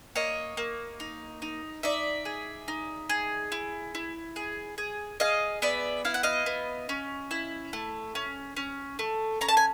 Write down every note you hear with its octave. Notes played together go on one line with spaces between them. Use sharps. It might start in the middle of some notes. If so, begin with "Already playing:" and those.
A#3 C#5 D#5
A#3
D#4
D#4
D#4 D5 E5
G#4
D#4
G#4
E4
E4
G#4
G#4
G#4 D#5 F5
B3 D5 E5
E4 F5
F#5
D#5 F5
B3
C#4
E4
A3
C#4
C#4
A3
C#4 A#5
A5
G#5